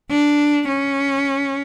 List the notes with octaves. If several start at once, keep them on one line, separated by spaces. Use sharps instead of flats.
D4
C#4